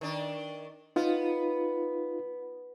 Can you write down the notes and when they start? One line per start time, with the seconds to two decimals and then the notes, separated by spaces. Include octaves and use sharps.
0.01 D#3 D4
0.96 B3 D#4 F4